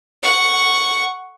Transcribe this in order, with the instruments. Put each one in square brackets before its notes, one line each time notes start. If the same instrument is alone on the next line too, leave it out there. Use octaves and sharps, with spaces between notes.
[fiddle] F#5 C#6